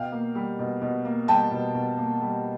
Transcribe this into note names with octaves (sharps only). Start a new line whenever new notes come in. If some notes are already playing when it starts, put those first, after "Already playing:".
Already playing: B2 F5 G5
A#3
G3
B2
B2
A#3
G3 G5 A5
B2
B2
A#3
G3